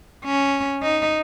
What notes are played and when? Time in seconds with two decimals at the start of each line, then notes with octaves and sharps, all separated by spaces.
0.25 C#4
0.83 D#4